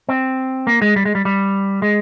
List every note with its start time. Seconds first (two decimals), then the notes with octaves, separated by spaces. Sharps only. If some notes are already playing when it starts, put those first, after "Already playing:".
0.09 C4
0.67 A#3
0.82 G#3
0.96 G3
1.05 G#3
1.15 G3
1.25 G3
1.82 G#3